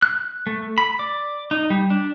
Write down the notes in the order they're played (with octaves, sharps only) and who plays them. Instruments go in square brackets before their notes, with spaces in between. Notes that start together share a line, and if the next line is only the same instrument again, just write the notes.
[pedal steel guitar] F#6
A3
B5
D5
D#4
G3
D4